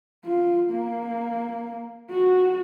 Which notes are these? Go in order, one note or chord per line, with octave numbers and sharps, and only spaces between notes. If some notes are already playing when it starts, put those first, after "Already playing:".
F4
A#3
F#4